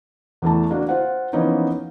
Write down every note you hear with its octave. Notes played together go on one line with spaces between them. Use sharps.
E2 E3 A3 A5
A#3 D4 F#4
F4 C5 F#5
E3 F3 A#3 B3 C#4 D#4